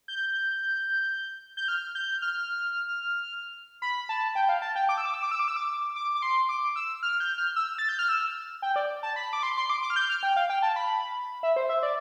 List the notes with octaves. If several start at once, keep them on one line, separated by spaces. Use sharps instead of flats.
G6
G6
F6
G6
F6
B5
A5
G5
F5
A5
G5
D6
E6
D6
E6
D6
E6
D6
E6
D6
D6
D6
C6
D6
E6
F6
G6
F6
E6
A6
G6
F6
E6
G5
D5
A5
B5
D6
C6
C6
D6
D6
F6
G6
F6
G5
F5
G5
A5
B5
E5
C5
E5
D5